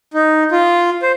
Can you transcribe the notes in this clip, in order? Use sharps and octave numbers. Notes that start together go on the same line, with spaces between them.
D#4
F4
C5